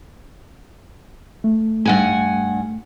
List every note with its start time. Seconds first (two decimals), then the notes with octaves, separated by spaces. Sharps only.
1.44 A3
1.85 G2 F#5 G#5